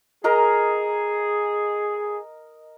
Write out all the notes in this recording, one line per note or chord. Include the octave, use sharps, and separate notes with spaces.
G#4 A#4 D#5 A#5